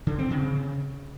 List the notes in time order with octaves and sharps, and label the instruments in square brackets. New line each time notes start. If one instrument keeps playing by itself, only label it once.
[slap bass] D3
C4
C#3